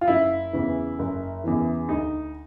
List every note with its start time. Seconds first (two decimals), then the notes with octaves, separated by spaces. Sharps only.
0.01 F4
0.08 F#1 E4
0.53 E2 C#3 E3
0.99 F#1
1.44 E2 C#3 E3
1.88 D2 D#4